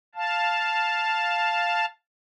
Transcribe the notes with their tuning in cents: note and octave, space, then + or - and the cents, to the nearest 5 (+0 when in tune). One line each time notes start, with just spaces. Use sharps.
F5 +0 A5 +0